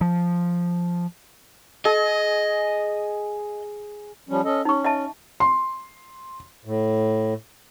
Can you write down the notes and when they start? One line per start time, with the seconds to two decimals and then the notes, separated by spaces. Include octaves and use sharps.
0.01 F3
1.85 G#4 D#5
4.29 F3 G3 C#4
4.45 C#4 A4 D#5
4.65 C#4 D#4 C#6
4.85 D#5 E5 A5
5.40 C6
6.65 A2